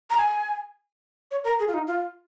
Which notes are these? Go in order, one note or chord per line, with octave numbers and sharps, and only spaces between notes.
A#5
G#5
C#5
A#4
G#4
F4
D#4
F4